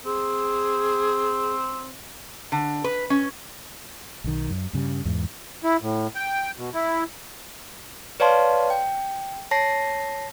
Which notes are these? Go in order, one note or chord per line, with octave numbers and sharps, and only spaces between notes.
C4 G#4
D3
B4
C#4
B1 D#3
F#2
G2 C#3 G3
E2 G#2
E4
A2
G5
B2
E4
B4 C#5 D5 F5 A5 C6
G5
C#5 A5 A#6 C7